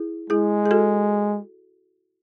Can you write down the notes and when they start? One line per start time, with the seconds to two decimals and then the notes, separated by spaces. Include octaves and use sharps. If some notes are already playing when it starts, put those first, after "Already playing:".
Already playing: E4 G#4
0.30 G#3 E4 G#4
0.66 G#4
0.71 F#4 A4